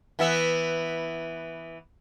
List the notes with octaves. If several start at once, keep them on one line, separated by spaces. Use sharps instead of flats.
E3 B3 E5